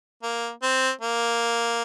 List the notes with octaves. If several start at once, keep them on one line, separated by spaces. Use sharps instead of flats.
A#3
C4
A#3